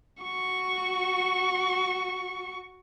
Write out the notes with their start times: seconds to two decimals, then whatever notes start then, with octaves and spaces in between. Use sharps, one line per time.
0.23 F#4 C#6